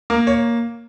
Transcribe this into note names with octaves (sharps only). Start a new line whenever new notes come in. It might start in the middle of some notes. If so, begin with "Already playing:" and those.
A#3 A#4
C#5